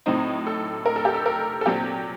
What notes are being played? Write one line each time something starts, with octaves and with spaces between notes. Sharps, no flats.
A2 F#3 C4 D#4
A4
A#4
A4
G4
A4
A#4
A4
A#2 F#3 C4 G4